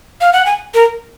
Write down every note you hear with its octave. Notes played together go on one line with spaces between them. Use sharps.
F5
F#5
G#5
A#4